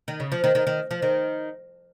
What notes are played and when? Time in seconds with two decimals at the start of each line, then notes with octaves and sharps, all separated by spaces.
0.08 D#3
0.20 C#3
0.32 F3
0.44 D#3
0.55 D#3
0.67 D#3
0.91 F3
1.02 D#3